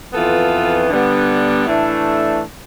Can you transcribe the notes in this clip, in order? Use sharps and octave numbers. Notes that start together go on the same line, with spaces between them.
F2 E3 B3 F4 A4
D3 G3 B3
A2 E3 A3 D4 A4